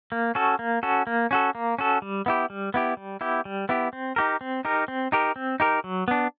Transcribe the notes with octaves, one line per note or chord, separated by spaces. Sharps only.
A#3
C#4 F#4 A4
A#3
C#4 F#4 A4
A#3
C#4 F#4 A4
A#3
C#4 F#4 A4
G3
B3 E4 G4
G3
B3 E4 G4
G3
B3 E4 G4
G3
B3 E4 G4
C4
D#4 G4 A#4
C4
D#4 G4 A#4
C4
D#4 G4 A#4
C4
D#4 G4 A#4
F#3
B3 D4